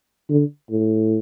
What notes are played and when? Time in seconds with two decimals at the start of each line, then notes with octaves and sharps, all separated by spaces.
0.30 D3
0.71 A2